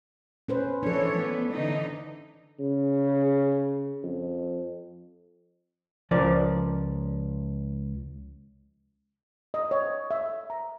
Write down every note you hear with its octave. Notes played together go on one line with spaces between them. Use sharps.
C#4 B4 C5
E3 F3 D4 A4 C#5
B3
D3 E3 D#4
C#3
F2
C#2 F3 A#4 D5
D#5
C#5
E5
A#5